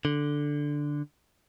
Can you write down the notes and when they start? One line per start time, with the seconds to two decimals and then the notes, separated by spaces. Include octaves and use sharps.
0.05 D3